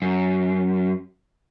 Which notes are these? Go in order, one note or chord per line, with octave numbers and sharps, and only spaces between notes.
F#2